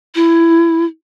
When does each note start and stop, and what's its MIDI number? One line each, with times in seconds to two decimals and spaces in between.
0.15 0.85 64